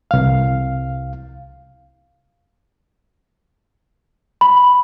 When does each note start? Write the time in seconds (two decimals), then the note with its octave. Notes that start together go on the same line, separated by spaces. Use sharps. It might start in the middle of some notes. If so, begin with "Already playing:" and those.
0.11 C2 F5
4.41 B5